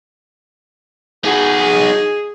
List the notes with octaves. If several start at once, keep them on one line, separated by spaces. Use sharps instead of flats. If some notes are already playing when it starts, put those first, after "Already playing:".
D#4 F#4 G#4